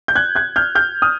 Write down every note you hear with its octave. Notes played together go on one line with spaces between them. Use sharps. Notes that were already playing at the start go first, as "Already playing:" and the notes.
G6
F#6 G#6
F#6 G#6
F6 G6
F6 G6
D#6 F6